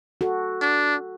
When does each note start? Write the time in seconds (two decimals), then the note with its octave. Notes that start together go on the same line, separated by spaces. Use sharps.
0.21 F#4 A4
0.61 D4